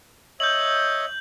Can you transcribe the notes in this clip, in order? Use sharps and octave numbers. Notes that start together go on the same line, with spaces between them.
C#5 D#5 E5 G6 F#7